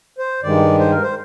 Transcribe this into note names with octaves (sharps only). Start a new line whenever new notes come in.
C5
G2 D#3 G#3 D5
C5
A#4
C5